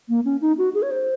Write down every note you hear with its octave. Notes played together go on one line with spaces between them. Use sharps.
A#3
C#4
D#4
F#4
G#4
C#5
C5